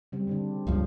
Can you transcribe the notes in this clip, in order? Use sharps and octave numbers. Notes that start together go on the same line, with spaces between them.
C#3 G3 C4
D3 C4 D4
C#2 G2 F3